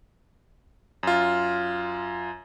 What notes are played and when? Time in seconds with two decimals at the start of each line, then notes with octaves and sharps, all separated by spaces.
1.03 F#2 F4